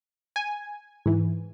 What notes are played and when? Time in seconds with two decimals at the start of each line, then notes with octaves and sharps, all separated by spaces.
0.36 G#5
1.06 G#2 E3